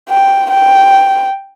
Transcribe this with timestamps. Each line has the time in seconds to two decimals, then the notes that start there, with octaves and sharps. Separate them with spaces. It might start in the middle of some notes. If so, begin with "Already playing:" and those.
0.09 G5
0.51 G5